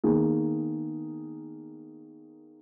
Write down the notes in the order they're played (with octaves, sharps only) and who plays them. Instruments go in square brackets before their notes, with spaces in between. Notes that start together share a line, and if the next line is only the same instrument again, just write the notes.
[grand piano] D#3 A#3 B3 G#4